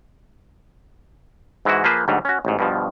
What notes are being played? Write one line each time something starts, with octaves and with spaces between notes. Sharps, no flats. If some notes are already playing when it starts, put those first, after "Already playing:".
G#2 E3 G#3 E4 F#4
F3 A#3 G#4 B4 C5
D2 G#2 F#3 G3
C#4 F#4
A1 G#2
G2 B2 F3